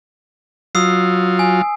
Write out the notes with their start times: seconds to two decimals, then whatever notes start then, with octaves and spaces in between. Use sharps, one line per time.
0.75 F#3 F4 D#6 E6 C7
1.39 G#5